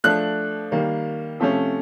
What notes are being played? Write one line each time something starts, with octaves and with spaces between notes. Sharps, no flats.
F3 A3 D4 F#6
D#3 G3 A#3
C3 F3 A3 C#4